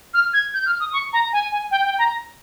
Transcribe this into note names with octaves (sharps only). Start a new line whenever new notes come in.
F6
G#6
G6
F6
D#6
C#6
A#5
G#5
G#5
G5
G5
A#5